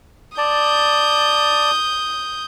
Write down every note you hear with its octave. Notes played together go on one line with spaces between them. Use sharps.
D5 A5 D#6 G6